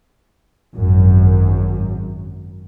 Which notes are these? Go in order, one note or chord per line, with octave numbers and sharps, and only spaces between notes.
G#1 F#2